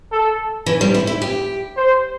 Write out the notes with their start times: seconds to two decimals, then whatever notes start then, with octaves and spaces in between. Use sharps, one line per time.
0.12 A4
0.66 E3
0.81 G3
0.94 E4
1.07 E4
1.22 G4
1.76 C5